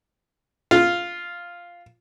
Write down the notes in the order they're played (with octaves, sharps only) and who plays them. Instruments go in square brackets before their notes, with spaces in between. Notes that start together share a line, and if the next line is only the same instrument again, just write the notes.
[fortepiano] F4